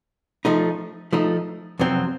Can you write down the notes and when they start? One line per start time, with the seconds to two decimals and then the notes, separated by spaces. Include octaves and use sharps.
0.45 F3 A3 D#4
1.13 F3 A3 D#4
1.80 F2 C3 F#3 C4